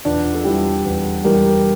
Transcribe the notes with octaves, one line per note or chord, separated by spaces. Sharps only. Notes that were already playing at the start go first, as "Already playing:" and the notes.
E2 D4 F4
A4
E3 G3 E4 G4
E2
E3 G3 G4 A#4